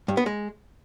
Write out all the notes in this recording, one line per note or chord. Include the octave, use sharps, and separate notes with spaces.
G2
B3
G#3